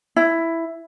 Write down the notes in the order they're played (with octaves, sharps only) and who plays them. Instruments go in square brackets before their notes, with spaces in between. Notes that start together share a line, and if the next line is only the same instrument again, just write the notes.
[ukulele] E4